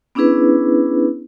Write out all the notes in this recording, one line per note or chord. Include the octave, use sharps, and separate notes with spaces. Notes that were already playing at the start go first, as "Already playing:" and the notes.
B3 C#4 D4 E4 G#4 B4